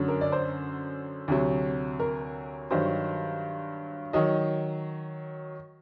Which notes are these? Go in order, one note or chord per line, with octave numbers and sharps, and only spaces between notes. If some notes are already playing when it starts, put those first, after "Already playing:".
Already playing: F#2 D3 F#3
A#4
D5
C5
D2 C3 F#3
A#4
G2 D#3 F#3 C5
D#3 F#3 D#5